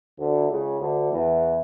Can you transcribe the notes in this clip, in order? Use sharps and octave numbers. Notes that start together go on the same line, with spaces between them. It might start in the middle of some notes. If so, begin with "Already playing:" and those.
D2 D3
C#2 C#3
D2 D3
E2 E3